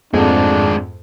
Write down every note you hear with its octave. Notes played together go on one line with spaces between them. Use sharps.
F2 G#2 G#3 A3 C4 D4